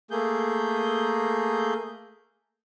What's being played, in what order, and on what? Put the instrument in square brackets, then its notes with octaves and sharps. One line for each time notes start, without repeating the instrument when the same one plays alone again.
[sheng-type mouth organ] A3 A#3 G#4 G6